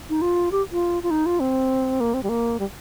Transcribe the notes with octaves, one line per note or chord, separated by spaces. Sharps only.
D#4
F4
G4
F4
F4
D#4
F4
C4
A#3
C4
G3
A#3
G3